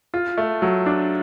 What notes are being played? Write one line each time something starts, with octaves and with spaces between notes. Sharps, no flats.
F4
A3
F#3
D4